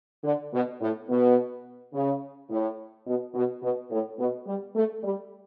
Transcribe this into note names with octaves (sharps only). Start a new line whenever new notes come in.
D3
B2
A2
B2
C#3
A2
B2
B2
B2
A2
B2
G3
A3
G3